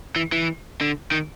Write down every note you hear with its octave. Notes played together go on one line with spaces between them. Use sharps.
E3
E3
D3
D#3